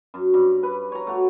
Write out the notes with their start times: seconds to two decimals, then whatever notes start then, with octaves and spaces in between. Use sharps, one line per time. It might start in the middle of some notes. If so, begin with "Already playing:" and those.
0.14 F#2
0.34 G2
0.63 B4
0.92 C#5 A#5
1.07 A3 F#4